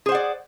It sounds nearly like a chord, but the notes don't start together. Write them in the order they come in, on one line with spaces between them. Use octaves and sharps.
G#4 C5 F#5 D5